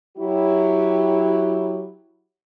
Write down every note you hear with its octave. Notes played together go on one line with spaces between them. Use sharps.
F#3 E4 G4